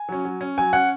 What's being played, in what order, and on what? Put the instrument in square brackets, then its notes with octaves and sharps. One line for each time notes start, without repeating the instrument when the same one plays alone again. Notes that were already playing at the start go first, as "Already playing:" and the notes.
Already playing: [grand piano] G#5
F#3 C#4
F#3
C#4
F#3 G#5
C#4 F#5